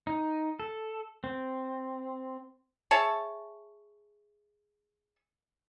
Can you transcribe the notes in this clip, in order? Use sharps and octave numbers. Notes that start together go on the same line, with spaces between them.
D#4
A4
C4
G#4 C#5 E5 A5